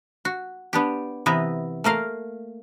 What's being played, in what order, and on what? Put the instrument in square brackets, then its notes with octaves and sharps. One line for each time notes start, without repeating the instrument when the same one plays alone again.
[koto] F#4
B3 D4 G4
C3 E3 B3 D#5 E5 A#5
A3 A#3 A#4 F5